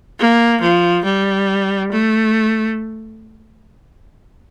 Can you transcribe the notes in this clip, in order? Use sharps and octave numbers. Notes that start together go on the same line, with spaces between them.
A#3
F3
G3
A3